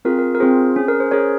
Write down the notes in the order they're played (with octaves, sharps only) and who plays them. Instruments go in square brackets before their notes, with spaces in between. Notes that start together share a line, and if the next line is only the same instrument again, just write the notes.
[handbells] C4 F4 G#4 A#4
A#4
A#4
C4 F4 G#4 C5
C#4 G#4
A#4
C5
C#4 G#4 A#4 C#5